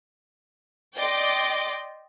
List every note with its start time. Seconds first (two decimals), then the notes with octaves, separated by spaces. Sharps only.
0.96 D5 D#5 G5 C6 D6